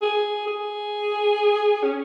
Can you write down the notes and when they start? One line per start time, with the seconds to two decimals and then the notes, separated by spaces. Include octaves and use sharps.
0.02 G#4
0.47 G#4
1.83 C#4